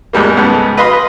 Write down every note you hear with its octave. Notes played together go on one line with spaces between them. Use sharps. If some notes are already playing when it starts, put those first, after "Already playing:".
E2 G#2 G3 A#3
C#2 G#2 B3 A4
B4 D#5 F5 B5 C6